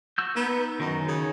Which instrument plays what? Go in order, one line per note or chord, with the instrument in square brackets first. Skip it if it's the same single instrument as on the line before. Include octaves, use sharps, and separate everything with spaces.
[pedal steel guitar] F#4 E6 G6
[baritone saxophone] B3 [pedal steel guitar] D#4 B4
[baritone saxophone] F#2 [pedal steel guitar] D#3 D#4
[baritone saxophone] C#3